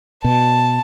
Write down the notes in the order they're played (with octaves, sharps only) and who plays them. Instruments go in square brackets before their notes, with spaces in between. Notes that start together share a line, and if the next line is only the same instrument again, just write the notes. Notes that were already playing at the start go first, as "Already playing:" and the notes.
[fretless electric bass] B2 [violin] A5